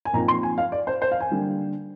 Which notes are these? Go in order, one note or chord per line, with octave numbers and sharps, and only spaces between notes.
G#5
A#2 F3 C4 D#4 A#5
C6
G#5
F5
D5
C5
C5
F5
G#5
D3 G3 A#3